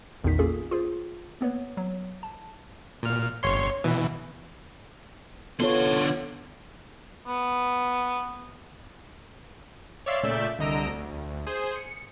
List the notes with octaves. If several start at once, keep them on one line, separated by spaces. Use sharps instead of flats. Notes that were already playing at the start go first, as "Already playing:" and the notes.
A1 E2 A#2 D#3 D#4 B6
A#3 C#4 F4 F#4 G#4 A4
F4 G#4 C5
A#3 B3 B4 C#5
F#3
A5
A#2 F6
G1 C#5 C6
B2 E3
D3 B3 F4 A4 C#5 C6
B3
C#5 D5 E5 F5 C6
A#2 C#3 A3 D5 E5 G6
C2 D3 D#5 A#5 E6 D7
D2
G#4 C5
C#7